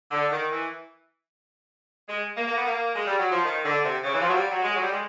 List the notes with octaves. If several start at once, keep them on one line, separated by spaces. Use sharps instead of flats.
D3
D#3
E3
G#3
A#3
A#3
B3
A#3
G#3
G3
F#3
F3
D#3
D3
C3
C#3
E3
F3
F#3
G3
F#3
G#3
F#3
G3
G#3